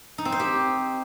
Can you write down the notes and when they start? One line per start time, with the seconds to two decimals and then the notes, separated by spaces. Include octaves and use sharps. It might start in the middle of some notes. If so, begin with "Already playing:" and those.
0.18 D#4
0.25 C4
0.32 C5
0.39 G4